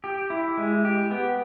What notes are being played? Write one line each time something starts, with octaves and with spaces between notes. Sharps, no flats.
G4
E4
G#3
G4
B3